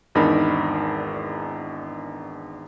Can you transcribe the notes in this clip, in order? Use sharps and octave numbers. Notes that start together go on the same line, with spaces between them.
G#1 E2 D4 D#4 A#4 B5